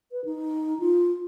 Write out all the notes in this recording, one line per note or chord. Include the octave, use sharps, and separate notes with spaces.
B4
D#4
F4